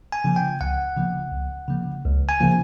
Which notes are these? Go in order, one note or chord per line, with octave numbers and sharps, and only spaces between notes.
G#5
C#3 F3 A#3
G5
C#2 F#5
C#3 F3 A#3
C#2
C#3 F3 A#3
C#2
G#5
C#3 F3 A#3